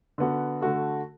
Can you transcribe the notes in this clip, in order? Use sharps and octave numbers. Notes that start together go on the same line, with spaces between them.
D3 B3 F#4
D3 A3 F#4 A4